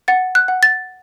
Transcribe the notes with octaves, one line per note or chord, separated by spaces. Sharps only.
F#5 A6
F#6
F#5
A6